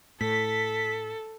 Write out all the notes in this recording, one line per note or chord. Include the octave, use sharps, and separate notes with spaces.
A2 A4 B6